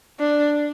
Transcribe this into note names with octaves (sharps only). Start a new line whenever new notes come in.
D4